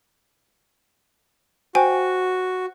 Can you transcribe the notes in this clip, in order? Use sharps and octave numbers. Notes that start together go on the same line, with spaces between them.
F#4 C5 G5 G#5